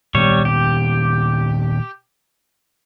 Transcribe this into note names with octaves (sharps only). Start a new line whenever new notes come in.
A#2 D#3 G3 B3 C#5
G4